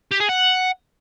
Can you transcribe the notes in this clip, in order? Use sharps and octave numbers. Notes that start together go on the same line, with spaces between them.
G4
G#4
F#5